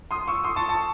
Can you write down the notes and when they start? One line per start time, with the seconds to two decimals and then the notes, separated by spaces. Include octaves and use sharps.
0.11 C6 D#6
0.28 C#6 E6
0.43 C6 D#6
0.56 A5 C#6
0.69 A5 C#6